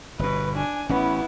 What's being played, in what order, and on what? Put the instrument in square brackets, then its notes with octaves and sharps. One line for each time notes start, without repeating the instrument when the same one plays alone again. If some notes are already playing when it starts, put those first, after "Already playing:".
[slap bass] G1 B2 [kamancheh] B4
[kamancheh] D4 G#5
[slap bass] A1 C#4 [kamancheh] B3 E4